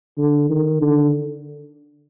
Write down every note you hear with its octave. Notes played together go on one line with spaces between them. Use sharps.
D3
D#3
D3